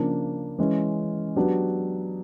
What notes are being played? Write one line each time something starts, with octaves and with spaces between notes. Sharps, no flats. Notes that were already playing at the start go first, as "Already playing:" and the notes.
Already playing: C#3 F3 A#3 D4
E3 G#3 C#4
F#3 B3 D4 G4